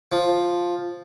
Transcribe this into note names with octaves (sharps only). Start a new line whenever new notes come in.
F3